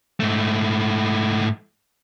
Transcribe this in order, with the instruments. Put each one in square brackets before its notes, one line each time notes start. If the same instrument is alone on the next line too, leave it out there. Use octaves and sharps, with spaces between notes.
[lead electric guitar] G#2 A3